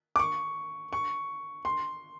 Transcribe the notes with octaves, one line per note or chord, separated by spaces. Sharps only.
D6
C#6
C#6
C6